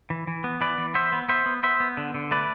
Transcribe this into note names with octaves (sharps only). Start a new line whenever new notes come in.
E3
E3
B3
E3 B4 D5
E3
B3 C5 E5
B3
B3 C5 E5
B3
B3 C5 E5
B3
D3
D3
A3 B4 D5